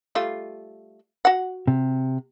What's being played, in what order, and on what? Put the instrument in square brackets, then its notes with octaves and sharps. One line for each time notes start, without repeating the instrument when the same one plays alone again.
[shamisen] G3 A3 F4
F#4 F#5
[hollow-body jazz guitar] C3